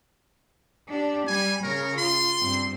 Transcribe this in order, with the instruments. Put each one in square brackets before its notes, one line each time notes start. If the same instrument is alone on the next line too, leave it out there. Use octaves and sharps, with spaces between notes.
[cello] D4 G4
[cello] G3 [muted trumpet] G#5
[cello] C#3 C#5 [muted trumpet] A#4
[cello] F4 [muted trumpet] C6
[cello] G2 C4